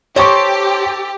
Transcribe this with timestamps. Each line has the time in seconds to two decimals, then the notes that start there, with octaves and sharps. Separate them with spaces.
0.16 D#4 G4 A4 C5 C#5 C#6